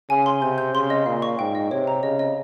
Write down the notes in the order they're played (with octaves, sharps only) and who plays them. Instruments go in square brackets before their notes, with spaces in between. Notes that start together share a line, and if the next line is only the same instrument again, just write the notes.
[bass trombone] C#3 [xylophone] G#5
[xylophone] C6
[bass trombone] C3 [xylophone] G6
[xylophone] G6
[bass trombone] C#3 [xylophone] C6
[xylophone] D#5
[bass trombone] A#2 [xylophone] F5
[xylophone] C#6
[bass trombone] G#2 [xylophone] G5
[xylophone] D#5
[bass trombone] C3 [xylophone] C#5
[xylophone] A#5
[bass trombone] C#3 [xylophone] D#5
[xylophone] D#5